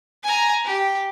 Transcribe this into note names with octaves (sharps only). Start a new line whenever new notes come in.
G#5 A#5
G4